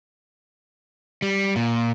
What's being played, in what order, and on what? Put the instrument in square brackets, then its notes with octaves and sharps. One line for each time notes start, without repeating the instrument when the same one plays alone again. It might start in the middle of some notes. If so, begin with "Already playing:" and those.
[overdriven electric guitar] G3
A#2